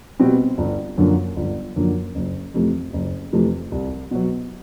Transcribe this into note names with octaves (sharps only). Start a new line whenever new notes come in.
B2 G3 C4
G1
F#2 D3 F3 A#3
G1
F#2 D3 F3 A#3
F#1
F2 C3 E3 A3
F#1
F2 C3 E3 A3
C2
B2 F#3